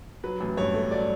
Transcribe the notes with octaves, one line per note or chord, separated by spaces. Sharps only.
F#3 B4
A1
G2 C#5
A3
F#3 D5